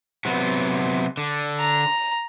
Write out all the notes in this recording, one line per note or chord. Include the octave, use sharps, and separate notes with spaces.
C3 F#3 B3
D3
A#5